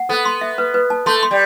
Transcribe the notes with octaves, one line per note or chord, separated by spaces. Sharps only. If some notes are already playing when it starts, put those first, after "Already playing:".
Already playing: F#5
B3 A4
C6
E5
B4
B4
A5
A3 C6
C6
G3